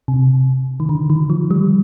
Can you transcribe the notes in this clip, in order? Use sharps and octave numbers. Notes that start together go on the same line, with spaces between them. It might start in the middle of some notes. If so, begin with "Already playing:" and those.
C3
D#3
D3
D#3
F3
G3